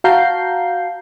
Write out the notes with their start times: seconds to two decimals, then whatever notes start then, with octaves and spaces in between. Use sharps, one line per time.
0.04 F#4 F5 A5 A#5 G6 C7